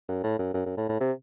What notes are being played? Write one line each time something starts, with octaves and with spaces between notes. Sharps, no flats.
F#2
A2
F#2
F#2
F#2
A2
A2
C3